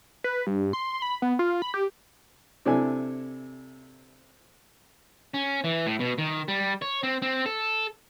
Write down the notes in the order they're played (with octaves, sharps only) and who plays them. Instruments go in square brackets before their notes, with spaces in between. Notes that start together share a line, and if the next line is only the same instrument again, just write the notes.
[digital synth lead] B4
G2
C6
B5
B3
F4
B5
G4
[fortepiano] C3 D4 E4 A4 G#5
[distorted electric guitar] C#4
E3
A2
B2
D#3
G3
C#5
C4
C4
A4